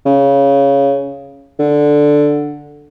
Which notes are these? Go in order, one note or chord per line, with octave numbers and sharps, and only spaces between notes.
C#3
D3